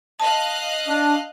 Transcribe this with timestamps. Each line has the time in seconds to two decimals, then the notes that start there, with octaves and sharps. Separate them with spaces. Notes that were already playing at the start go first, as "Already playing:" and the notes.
0.20 D#5 F5 A5 F#6
0.87 D4